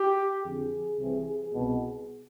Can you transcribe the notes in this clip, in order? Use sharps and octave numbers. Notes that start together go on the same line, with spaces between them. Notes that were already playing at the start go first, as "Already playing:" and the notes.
Already playing: G4
F2 D3 G#4
C2 C3 E3
C2 B2